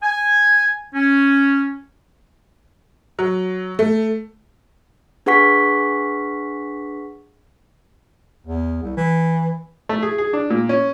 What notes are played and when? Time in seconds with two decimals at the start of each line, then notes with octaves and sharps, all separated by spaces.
0.03 G#5
0.93 C#4
3.19 F#3
3.79 A3
5.26 D4 G#4 B4 F#5 C#6 B6
8.47 E2
8.83 C2
8.97 E3
9.89 A3
10.02 G#4
10.18 G#4
10.33 D4
10.50 A#2
10.69 C#4